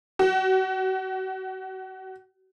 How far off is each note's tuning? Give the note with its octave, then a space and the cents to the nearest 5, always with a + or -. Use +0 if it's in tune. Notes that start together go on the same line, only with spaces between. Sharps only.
F#4 +35